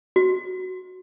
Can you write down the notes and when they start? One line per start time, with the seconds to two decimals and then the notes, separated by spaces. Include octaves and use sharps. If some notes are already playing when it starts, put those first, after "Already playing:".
0.16 F#4